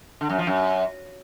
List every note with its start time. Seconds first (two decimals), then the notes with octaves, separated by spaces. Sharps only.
0.21 D3
0.30 F#2
0.38 F3
0.47 F#2